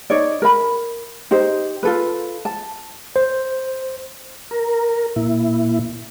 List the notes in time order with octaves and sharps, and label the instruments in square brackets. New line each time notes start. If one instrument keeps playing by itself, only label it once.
[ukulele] D#4 C#5 D5
A#4 B5
D#4 G4 C5
F4 A4 B4
A5
[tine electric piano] C5
[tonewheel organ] A#4
A#2 E4